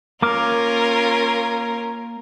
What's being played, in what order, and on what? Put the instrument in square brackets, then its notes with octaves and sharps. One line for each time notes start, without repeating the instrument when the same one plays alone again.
[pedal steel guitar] A#3 D6 F6 [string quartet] C#4 F4 A#4